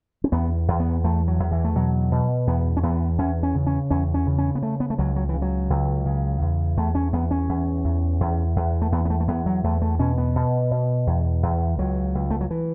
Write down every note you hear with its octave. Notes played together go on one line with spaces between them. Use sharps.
C#4
E2 B3
E2
B3
E2 A3
F#3
E2
E3
A3
B2 F#3
B2
E2 B3
C#4
E2 B3
E2 C#4
C#4
C#3
C#4
E2 C#4
C#4
C#3
C#4
B3
C#3 A3
B3
A3
C#2 F#3
F#3
E3
C#3
F#3
C#2
C#3
E2
E2 A3
C#4
E2 B3
C#4
E2
E2
E2
E2
A3
E2 B3
B3
A3
A3
E2 B3
F#3
E2 A3
A3
B2 C#4
B3
B2
B2
E2
E2
C#2 F#3
C#2
A3
F#3
E3